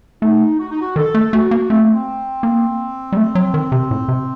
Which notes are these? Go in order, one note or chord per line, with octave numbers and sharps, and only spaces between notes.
A3 D#4
F#4
D#4
F#4
D#3 A4
A3
A3 F#4
A#3
A3 C4
A#3
C4
A#3
G3
A3
F#3
D#3
C3
A2
C3